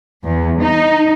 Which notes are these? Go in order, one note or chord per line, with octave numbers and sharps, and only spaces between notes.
E2
D#4